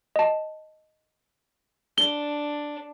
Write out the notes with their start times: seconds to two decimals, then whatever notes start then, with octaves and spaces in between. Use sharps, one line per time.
0.16 D#5 A5
1.98 D4 G7